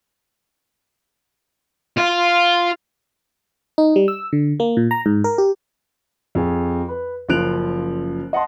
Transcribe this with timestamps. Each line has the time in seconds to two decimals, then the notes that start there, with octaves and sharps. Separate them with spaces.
1.98 F4
3.78 D#4
3.96 G3
4.08 E6
4.33 D3
4.60 A#3
4.77 A#2
4.91 A#5
5.06 G#2
5.24 A#4
5.38 G4
6.35 F2 G#4
6.89 B4
7.29 F#1 C#3 F3 F#6 D7 F7
8.33 D#5 F#5 A5 C6